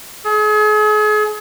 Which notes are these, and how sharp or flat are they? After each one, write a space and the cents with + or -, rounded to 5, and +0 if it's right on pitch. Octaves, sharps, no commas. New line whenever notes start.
G#4 +40